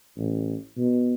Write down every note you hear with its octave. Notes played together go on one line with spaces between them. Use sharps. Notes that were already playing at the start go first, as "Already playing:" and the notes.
A1
B2